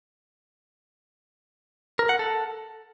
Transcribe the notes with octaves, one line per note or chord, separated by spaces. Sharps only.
A#4
F#5
A4